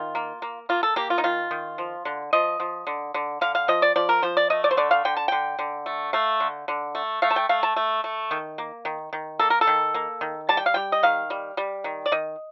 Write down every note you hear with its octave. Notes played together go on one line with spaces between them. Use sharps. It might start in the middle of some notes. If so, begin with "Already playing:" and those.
Already playing: D#3 F4
A#3
A#3
A#3 F4
A4
A#3 G4
F4
D#4
D#3 F4
D#3
F3
D3
F3 D#5
F3
D3
D3
D3 F5
F5
F3 D#5
D5
F3 D5
A#4
F3 C5
D5
A3 D#5
D5
C5
D3 D5
F5
D3 G5
A5
D3 G5
D3
A3
A3 F5
D3
D3
A3
A3 F5
A5
G5
A3 F5
A5
A3
A3
D#3
A#3
D#3
D#3
A#3 A4
A#4
A4
D#3
A#3
D#3
G3 A5
G5
F5
G3 G5
D#5
D#3 F5
G3
G3
D#3
D5
D#3 D#5